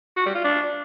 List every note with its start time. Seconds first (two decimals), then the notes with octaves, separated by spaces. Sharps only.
0.17 F#4
0.26 G3
0.35 F4
0.44 D4